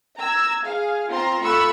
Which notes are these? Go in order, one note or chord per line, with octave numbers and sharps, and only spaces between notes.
A#5 E6 G#6
G#4 F5
C4 F4 A#5 C6
A3 F4 B5 C#6 E6 F#6